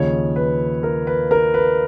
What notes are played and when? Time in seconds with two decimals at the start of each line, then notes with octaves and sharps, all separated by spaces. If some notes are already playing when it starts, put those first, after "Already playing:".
Already playing: D#2 C#3 F3 C#5
0.36 B4
0.83 A#4
1.07 B4
1.31 A#4
1.54 B4